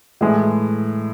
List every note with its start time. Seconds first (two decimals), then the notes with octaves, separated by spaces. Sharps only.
0.21 A2 E3 G#3